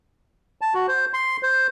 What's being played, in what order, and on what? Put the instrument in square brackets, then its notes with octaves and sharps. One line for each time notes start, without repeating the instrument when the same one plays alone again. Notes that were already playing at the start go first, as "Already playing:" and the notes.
[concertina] A5
F#4
C5
C6
C5